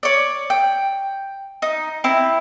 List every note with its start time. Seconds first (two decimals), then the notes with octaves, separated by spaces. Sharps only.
0.03 C#5 D5
0.50 G5
1.62 D#4
2.04 C4 E4